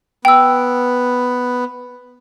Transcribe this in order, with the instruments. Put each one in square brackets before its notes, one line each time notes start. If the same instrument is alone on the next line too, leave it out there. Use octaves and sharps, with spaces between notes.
[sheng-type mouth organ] B3 [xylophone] G5 E6